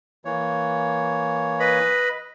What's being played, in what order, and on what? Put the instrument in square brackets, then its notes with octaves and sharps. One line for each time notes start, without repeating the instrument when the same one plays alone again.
[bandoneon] E3 A#3 C#5
[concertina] B4 D#5 B5